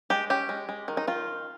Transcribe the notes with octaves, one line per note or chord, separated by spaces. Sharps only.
G#3 G4
C#4 G4
G#3
G#3
D#3
D#4
D#3 F4